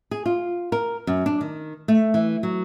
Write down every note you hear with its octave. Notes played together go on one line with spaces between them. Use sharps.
G#4
F4
A#4
F#2
D4
D#3
A3
E3
F#3